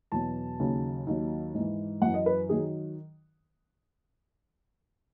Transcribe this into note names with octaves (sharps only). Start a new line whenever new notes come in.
E2 B2 F#3 A5
D#2 C#3 F#3
D#2 D#3 F#3
G#2 E3
F#2 E3 F#5
D#5
B4
D#3 F#3 G#4